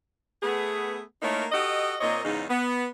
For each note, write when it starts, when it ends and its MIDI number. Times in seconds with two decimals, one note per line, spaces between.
0.43 1.01 57
0.43 1.01 59
0.43 1.01 68
1.22 1.45 57
1.22 1.45 58
1.22 1.45 63
1.22 1.45 64
1.22 1.45 70
1.22 1.45 73
1.52 1.94 66
1.52 1.94 67
1.52 1.94 69
1.52 1.94 75
2.01 2.23 46
2.01 2.23 58
2.01 2.23 60
2.01 2.23 73
2.01 2.23 75
2.24 2.44 40
2.24 2.44 44
2.24 2.44 49
2.24 2.44 61
2.24 2.44 63
2.49 2.85 59